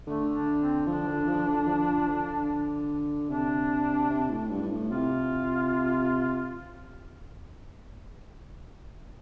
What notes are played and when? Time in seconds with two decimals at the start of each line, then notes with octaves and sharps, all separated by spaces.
0.06 D3 A3
0.33 D4
0.60 C4
0.87 F3 D4
1.07 D3
1.28 F3
1.47 D3
1.67 F3
2.08 D3
3.29 C3 D4
4.10 C3
4.30 A2
4.50 G2
4.63 G2
4.71 A2
4.91 C3 F4